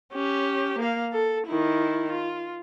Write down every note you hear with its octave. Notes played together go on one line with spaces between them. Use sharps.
C#4 G4
A#3 F5
A4
D#3 E4
F4